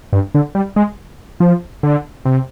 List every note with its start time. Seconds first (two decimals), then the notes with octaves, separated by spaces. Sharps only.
0.13 G2
0.35 D3
0.55 G3
0.76 G#3
1.40 F3
1.83 D3
2.25 C3